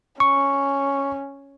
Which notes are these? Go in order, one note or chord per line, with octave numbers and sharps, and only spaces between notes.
C#4 C#6